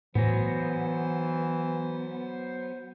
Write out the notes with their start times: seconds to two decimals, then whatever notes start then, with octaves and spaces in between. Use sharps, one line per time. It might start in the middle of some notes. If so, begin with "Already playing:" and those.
0.15 A2 E3 F#3 B3 C5